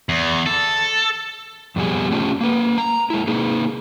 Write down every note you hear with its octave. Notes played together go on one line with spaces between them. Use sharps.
E2
A4
F2 B2 G3 G#4
A3 C#4 D4 F4 G4
A#3 B4
A#5
G#3 E4
A#3 D#4 G#4